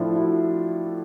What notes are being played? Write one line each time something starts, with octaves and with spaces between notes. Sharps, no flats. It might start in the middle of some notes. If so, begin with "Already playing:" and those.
Already playing: A2 F3 D4 E4
E4 F#4